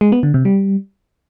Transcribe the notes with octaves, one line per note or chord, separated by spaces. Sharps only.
G#3
B3
D3
C3
G3